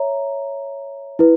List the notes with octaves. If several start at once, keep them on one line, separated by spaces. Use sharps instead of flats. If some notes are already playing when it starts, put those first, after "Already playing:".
Already playing: C#5 E5 A#5
E4 B4